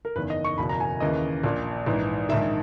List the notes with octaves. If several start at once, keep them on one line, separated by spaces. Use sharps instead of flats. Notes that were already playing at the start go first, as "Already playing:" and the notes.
A#4
F#1 E2 D#3 B4
D#5
C#6
F#1 E2 B2 B5
A#5
G#5
D#2 C#3 E3 D#5
A#1 A#2
A#1 G#2 E3
A#1 G#2 D#3 E5